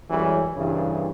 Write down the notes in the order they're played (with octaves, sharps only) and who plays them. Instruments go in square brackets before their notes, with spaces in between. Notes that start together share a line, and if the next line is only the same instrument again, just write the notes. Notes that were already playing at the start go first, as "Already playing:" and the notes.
[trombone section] F#2 E3 G3 G#3 C#4 G#4
C2 G2 C#3 E3